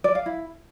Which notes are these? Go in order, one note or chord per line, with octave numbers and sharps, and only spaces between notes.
D5
F5
E4